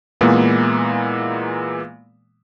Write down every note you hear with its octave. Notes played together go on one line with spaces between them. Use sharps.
A#2 E3 G#3 A#3 B3